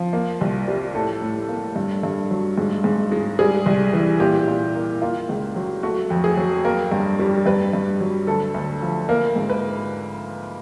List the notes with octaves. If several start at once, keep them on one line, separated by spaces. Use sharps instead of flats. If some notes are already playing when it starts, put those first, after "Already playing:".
Already playing: F3
A#3
C2
G3
A2 A4
A2
A#3
G2
G2
F#3
G#2
G#2
G#3
G3 G#4
C2
E3
A#2 G4
A#2
A#3
A#3 F4
C#2
F#3
A3 F#4
F2
G#4
F#3
A#3 A#4
G2
G3
G2 B4
G2
F#3
D2 A4
D2
F3
A#3 A#4
G#2
B4